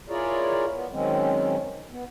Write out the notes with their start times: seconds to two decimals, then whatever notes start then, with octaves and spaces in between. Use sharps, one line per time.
0.09 E4 F4 G#4 A#4 C#5 D5
0.73 B3
0.92 D#3 F#3 G#3 C4 C#4
1.91 B3